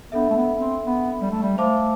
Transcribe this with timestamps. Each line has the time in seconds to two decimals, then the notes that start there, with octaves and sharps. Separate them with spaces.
0.12 B3 D4 A4 E5
0.30 A3
0.36 B3
0.60 C4
0.85 B3
1.21 G3
1.31 A3
1.42 G3
1.58 A3 C5 F5 A5 D6